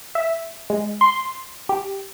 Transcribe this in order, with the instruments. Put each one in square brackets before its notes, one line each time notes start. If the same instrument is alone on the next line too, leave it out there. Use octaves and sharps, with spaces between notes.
[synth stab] E5
G#3
C6
G4